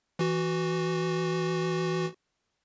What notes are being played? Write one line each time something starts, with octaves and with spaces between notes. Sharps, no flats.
E3 F#4